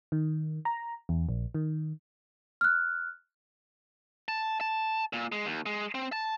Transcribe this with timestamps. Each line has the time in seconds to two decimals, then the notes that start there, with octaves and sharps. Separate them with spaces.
0.12 D#3
0.65 A#5
1.09 E2
1.29 A#1
1.55 D#3
2.61 F6 F#6
4.28 A5
4.61 A5
5.13 A#2
5.32 G#3
5.46 D#2
5.66 G#3
5.95 C4
6.12 A5